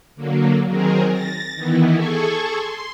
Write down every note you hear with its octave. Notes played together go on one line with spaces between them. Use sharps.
D3 F#3 A#3
D#3 F#3 C4 G#4 A#4
A6 A#6
D#3 E3 B3 E4
G#4 A4 G#5 C#6
C6